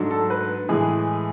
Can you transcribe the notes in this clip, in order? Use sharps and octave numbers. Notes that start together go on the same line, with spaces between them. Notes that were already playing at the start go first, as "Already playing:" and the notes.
Already playing: G#2 F#3 A3 D4
A4
B4
A2 E3 G#3 G#4